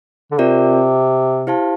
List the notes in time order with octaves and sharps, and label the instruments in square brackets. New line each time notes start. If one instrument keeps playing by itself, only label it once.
[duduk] D3
[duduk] C3 [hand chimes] C4 F4 A#4 D5
[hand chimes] E4 G4 C5 F5 A5